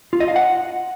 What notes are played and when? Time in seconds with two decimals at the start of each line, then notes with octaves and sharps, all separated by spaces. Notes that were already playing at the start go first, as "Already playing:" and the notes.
0.13 F4
0.20 D#5
0.28 F5
0.36 F#5